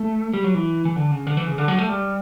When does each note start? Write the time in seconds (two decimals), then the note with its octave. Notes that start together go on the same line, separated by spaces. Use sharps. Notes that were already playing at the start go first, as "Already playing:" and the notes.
Already playing: A3
0.34 G3
0.44 F#3
0.54 E3
0.85 E3
0.96 D3
1.11 C#3
1.27 D3
1.37 E3
1.47 C#3
1.58 D3
1.68 F#3
1.79 A3
1.89 G3